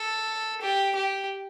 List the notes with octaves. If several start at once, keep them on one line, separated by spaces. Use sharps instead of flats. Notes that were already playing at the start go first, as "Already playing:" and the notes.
Already playing: A4
G4
G4